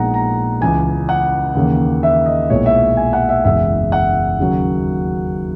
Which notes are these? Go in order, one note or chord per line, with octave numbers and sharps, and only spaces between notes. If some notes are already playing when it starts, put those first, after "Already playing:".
Already playing: A#1 A#2 G#3 B3 D#4 F#5 A#5
A#5
C#2 C#3 E3 G#5
F#5
D#2 C#3 E3 A#3
E5
D#5
B1 A#2 G#3 B3 E4 C#5
E5
G#5
F#5
E5
F#1 E2 B2 G#3 B3 E5
F#5
D#2 C#3 F#3